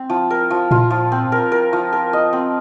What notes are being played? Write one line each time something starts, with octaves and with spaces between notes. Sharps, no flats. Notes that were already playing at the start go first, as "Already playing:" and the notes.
Already playing: C4
F3
A#4
F3
A#2 F4
F3
C4
A#4
A#4
F3
A#4
D#5
C4